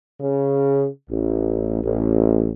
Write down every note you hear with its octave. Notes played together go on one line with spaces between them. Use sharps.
C#3
A1
A1